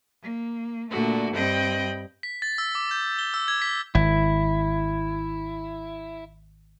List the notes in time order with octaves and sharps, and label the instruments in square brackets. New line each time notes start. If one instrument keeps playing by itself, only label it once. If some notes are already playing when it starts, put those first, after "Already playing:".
[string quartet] A#3
A#2 D3 A3 F#4
G2 C4 D#5 G5 B5
[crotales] B6
A6
E6
D6
G6
G7
E6
G#6
B6
[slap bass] G#1 [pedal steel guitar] E4